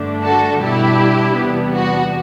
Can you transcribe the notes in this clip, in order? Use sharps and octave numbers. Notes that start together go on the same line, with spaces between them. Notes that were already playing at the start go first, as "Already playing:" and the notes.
Already playing: G2 D3 A3 D4
F#4 A4
B2 G3 D4 E4 G4
E2 C3 G3 B3 D4
F#4